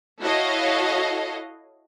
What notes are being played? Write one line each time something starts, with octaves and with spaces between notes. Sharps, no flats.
E4 F#4 A4 C#5 D#5 F5